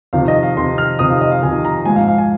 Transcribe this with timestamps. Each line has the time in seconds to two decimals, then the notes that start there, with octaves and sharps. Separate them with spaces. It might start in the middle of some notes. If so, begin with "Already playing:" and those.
0.13 F2 C3 D#3 F5
0.28 D#5
0.43 F5
0.56 F2 C3 D#3 C6
0.78 F6
0.99 F2 C3 D#3 D#6
1.10 F5
1.21 D#5
1.31 F5
1.42 F2 C3 D#3 G#5
1.65 A#5
1.86 G#2 F3 G#3 G#5
1.96 F5
2.08 F5
2.18 G#5